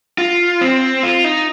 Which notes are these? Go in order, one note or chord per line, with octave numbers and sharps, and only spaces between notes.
F4
C4
F4
D#4